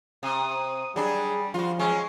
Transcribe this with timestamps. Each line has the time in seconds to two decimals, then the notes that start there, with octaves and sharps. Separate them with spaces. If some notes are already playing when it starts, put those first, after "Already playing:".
0.23 C3 D#6
0.96 F#3 G3 D4 G#4
1.54 F3 F4 F#4
1.79 F#3 G#3 C#4